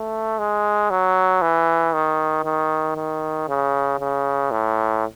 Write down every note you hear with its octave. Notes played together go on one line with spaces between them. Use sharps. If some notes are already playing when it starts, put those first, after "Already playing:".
Already playing: A3
G#3
F#3
E3
D#3
D#3
D#3
C#3
C#3
A2